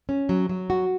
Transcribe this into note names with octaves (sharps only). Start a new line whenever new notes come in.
C#4
F#3
F#3
F#4